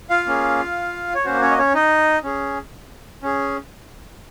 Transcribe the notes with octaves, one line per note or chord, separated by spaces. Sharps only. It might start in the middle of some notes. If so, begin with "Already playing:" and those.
F4 F5
A#3 C#4 G#4
C#5
A#3 C#4 F#4 C5
C#4 C#5
D#5
C#4 C#5
D#4 D#5
C#4 G#4
C#4 G#4